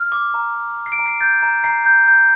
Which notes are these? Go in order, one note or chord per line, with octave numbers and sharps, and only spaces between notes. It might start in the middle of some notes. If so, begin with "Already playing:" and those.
Already playing: F6
D6
A#5
A#5
D6
C7
D7
A#5
C7
G6 A6
A#5
A#5 C7
G6
G6